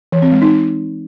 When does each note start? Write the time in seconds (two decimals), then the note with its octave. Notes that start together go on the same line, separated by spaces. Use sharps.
0.12 E3
0.22 C4
0.32 G#3
0.42 D#4